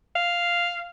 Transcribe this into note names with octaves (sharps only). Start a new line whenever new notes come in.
F5